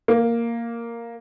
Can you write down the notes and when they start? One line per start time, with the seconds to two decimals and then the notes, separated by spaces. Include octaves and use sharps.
0.08 A#3